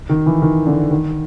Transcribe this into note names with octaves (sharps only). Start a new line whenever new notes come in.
D#3
E3
D#3
D3
D#3